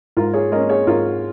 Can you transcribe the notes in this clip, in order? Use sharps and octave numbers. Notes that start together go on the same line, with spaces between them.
G#2 F4 A#4
G#4 C#5
G#3 C#4 A#4 D#5
G#4 C#5
G#2 F4 A#4